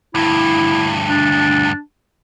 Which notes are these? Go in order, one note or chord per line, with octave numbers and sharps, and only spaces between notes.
D2 G2 E4
D4